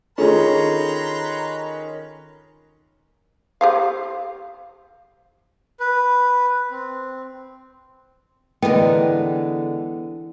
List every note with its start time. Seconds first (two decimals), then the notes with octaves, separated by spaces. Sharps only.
0.18 D#3 C#4 F4 G#4 A4 B4 A#5 C6
3.61 G4 C5 F5
5.80 B4
6.71 C4
8.62 D3 E3 G#3 B3 A#4 G5